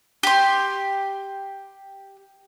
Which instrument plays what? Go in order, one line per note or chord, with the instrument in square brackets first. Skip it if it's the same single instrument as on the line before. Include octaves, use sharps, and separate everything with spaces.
[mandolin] G4 C6